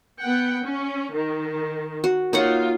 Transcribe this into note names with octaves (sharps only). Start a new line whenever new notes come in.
B3 F#5 G5
C#4
D#3
F#4
A#3 D#4 F4 C#5 F#5